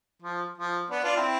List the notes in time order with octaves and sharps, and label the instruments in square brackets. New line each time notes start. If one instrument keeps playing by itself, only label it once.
[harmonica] F3
F3
B3 D4
D4 F4
C4 E4